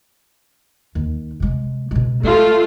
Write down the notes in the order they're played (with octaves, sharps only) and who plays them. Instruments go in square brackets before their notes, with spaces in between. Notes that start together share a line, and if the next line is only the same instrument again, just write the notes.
[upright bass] D#2
C3 G#3
B2 G#3
[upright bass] G#3 [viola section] A3 F4